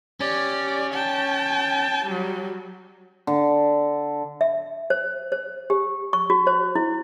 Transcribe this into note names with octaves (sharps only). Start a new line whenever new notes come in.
C#4 G4 D5
G5 A5
F#3 G3
D3
E5
C5
C5
G4
C#6
F#4
C5
E4